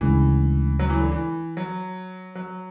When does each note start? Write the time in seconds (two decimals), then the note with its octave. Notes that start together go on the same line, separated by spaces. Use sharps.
0.01 D2 C#3 E3 G#3 C#4
0.79 F#3
0.90 E3
1.01 D3
1.12 E3
1.57 F#3
2.35 F#3